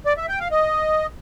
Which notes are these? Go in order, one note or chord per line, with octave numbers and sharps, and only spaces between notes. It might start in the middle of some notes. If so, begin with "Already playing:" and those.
D5
E5
G5
F5
D#5